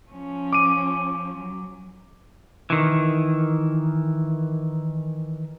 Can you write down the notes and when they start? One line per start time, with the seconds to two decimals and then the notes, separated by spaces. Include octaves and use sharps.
0.10 F3 C#4
0.53 D6 D#7
1.36 F#3
2.70 D#3 E3